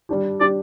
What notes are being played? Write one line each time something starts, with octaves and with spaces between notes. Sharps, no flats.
G3 D4 G4
G3 D4 G4 D5